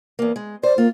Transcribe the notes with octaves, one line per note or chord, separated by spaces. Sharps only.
E2 A#3
G#3
C5 D5
A#3 F4